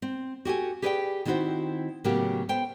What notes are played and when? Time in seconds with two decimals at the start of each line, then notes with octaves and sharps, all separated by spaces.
0.02 C4
0.45 F#4 G4 A4 G#5
0.82 G4 G#4 B4 D5 F5 G5
1.25 D#3 C4 E4 F#4 C5
2.04 A2 C#3 F#3 A#3 B3 G4
2.49 B3 A4 C5 G5